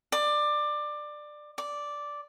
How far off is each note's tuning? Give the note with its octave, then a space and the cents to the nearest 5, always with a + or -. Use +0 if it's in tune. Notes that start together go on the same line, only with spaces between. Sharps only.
D5 +20
D5 -5